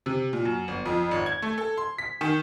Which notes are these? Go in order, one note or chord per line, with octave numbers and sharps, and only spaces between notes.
C3
A#2
F#2
G1
F2
G#1
G#6
A3
A4
C6
B6
D#3